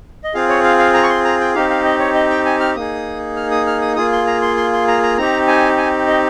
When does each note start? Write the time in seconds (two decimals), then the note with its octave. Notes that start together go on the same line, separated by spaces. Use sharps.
0.24 D#5
0.34 C4 F4 G#4 F5
0.49 C#5
0.64 F5
0.79 F5
0.94 A#5
1.03 C#6
1.09 C6
1.25 A#5
1.40 G5
1.55 C4 D#4 G4 F5
1.70 F5
1.85 D#5
2.00 C#5
2.15 D#5
2.30 G5
2.45 G#5
2.60 F6
2.76 A#3 D#4 G#4 D#6
3.36 F6
3.51 D#6
3.67 F6
3.82 D#6
3.96 A#3 F4 G#4 D#6
4.12 C6
4.27 A#5
4.42 C6
4.57 C6
4.73 C6
4.88 A#5
5.03 A#5
5.18 C4 D#4 G4 A#5
5.48 G#5
5.78 G#5
6.08 D#5